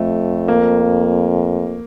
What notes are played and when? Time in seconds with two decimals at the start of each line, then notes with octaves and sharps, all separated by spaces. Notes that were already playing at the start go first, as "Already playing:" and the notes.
Already playing: F2 A3
0.48 A#3